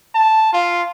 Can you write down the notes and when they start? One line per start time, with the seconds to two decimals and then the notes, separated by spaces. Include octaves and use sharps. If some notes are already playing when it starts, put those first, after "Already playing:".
0.15 A5
0.53 F4